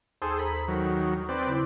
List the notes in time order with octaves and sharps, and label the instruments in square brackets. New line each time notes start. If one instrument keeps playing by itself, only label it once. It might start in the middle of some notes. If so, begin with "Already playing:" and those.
[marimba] D#2 [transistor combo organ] G#4 A4 C5
[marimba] A4 C5 A#5 [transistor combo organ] B5
[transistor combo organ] D#3 F#3
C4 B4 D5
[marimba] C#3 E4